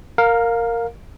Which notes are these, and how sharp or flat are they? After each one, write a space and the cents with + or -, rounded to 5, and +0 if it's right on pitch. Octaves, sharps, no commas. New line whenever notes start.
A#4 -10 F5 +15